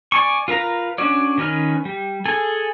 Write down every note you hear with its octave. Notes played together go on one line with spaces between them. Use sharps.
D5 G#5 C#6
F4 A#4 B4 A#5
C#4 D4 F#4 C#5 D5
D#3 C#4 B4 F6
G3
G#4 A4 G#5